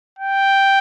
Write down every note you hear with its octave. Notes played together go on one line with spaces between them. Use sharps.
G5